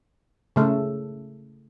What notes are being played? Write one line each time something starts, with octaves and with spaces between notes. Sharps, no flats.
C#3 A3 A4